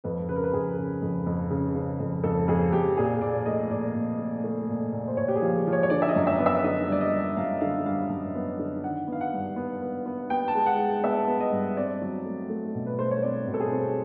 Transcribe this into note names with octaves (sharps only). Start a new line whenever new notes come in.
F2 B4
C#3 B4
A#4
B4
F2 G#4
C#3
F2
F2
C#3
C#3
F2
F2 A4
F2 G#4
F2 G4
A#2 G#4
A#2 D5
A3 D#5
A#2 D5
A#2
A3
A3
A#2
A#2
C5
A#2 C#5
G4
G#4
F3
F3
C#5
C#5
D3 D5
E5
D#5
F#2
E5
B3
E5
D3 D#5
G3 D5
D#5
G3
F#2 F5
D3 F5
G3 F5
F#2
B3
D3
D#3 F#5
B3
F5
F#5
G2
B3
B3
B3
B3 G5
A5
G#3
F#5
G#3
B3 E5
B3
D#5
G2
C4 D5
F#3
A3
A3
B2
B4
A3 C5
C#5
C4 D5
B2
A4
G#4
C4